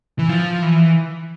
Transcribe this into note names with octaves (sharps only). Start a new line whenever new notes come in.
E3
F3
E3